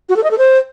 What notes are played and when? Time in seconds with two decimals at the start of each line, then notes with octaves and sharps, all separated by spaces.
0.09 F#4
0.16 A4
0.24 D#5
0.31 A4
0.38 C5